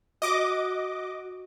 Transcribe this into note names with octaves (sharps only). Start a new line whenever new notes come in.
F#4 D#5 D6